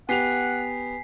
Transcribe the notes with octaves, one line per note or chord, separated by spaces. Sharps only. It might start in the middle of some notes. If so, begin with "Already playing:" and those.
B3 G4 F#5 G#5 B6 C7 F7